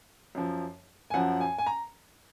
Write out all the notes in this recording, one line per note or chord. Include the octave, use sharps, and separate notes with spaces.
F#2 F3
G#5
F#2 F3 F#5
G#5
G#5
A#5